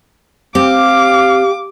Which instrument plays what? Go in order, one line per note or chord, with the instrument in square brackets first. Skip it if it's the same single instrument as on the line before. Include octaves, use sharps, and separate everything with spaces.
[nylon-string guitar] C4 [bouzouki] G4 [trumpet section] F5 [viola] D6